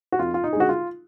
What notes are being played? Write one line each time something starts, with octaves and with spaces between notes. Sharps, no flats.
F#4
F2 F4
F4
D#4
G#4
D3 G#3 F#4
F4